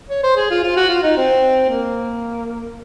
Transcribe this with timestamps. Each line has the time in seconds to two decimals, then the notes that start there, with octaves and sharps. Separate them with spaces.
0.10 C#5
0.24 C5
0.37 G#4
0.50 F4
0.64 F4
0.77 F#4
0.89 F4
1.03 D#4
1.17 C4
1.70 A#3